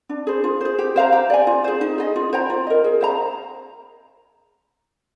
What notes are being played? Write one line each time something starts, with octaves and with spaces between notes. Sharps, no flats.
D4
G#4 C5
F4
G#4 C5
G4
C5 F5 A#5
G4
D5 G#5
F4
G#4 C5
D#4
G#4 D#5
F4
C5 G5 A#5
F4
A#4 D#5
G#4
C5 F5 A#5